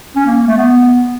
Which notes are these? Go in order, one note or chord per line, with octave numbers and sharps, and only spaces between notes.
C#4
A#3
A#3
A3
B3